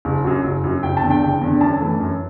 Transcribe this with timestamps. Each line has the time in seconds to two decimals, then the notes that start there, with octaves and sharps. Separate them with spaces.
0.05 F#1
0.25 F#2 F#3
0.44 F#1
0.64 F#2 F#3
0.83 F#1 G5
0.97 A5
1.02 E2 D3
1.11 G5
1.21 F#1
1.41 E2 D3
1.61 F#2 A5
1.80 E3 A3
2.00 F#2